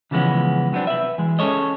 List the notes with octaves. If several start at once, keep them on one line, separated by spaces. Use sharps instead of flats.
C#3 E3 F3 G#3 B3 C#4
C3 F#3 B3 C4 D4
B4 E5
E3 G#3
C#4 G#4 A4 C#5 D#5